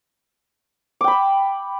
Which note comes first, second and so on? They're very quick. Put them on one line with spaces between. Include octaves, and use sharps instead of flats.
D6 G5 B5 E6